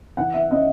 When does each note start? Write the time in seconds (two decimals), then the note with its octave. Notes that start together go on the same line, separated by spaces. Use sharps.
0.17 E3 F#5
0.34 E5
0.51 C#4 D#5